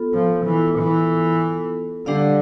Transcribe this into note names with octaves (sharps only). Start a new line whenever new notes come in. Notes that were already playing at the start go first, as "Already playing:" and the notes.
Already playing: B3 F4 A4
F3
E3
E3
D3 G3 D4 G4 D5 F5